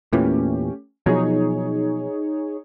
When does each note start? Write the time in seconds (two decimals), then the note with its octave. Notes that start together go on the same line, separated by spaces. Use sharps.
0.13 E2 A#2 E3 A3 C#4 G4
1.06 B2 F3 F#3 D#4 G#4 C#5